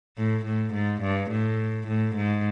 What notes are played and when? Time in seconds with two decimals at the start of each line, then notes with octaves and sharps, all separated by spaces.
0.18 A2
0.45 A2
0.74 G#2
1.02 G2
1.30 A2
1.88 A2
2.16 G#2